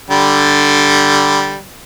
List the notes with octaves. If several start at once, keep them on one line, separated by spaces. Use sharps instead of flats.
D3 G3